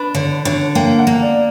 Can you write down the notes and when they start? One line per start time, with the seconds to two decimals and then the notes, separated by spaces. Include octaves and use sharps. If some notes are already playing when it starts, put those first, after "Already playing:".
Already playing: D4 B4
0.15 D3 C#5
0.45 D3 C#5
0.75 A#3 G5
0.99 F#5
1.07 A#3
1.22 D5